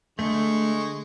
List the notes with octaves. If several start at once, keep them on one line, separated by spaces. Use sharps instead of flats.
D3 G#3 A3 C#6